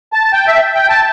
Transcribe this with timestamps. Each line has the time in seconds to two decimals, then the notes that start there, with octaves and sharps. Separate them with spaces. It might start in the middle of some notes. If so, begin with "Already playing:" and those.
0.13 A5
0.33 G5
0.47 E5
0.75 G5
0.89 A5